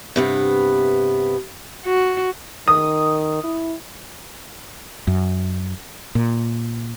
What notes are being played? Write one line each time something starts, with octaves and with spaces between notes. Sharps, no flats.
G2 C3 B3
F#4
D#3 D#6
E4
F#2
A#2